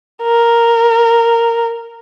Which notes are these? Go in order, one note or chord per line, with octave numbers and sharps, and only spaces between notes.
A#4